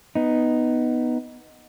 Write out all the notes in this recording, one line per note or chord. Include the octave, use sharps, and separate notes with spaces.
B3 D#4